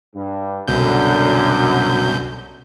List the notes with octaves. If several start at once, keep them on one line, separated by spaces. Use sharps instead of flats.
G2
C2 F#2 B2 D3 G6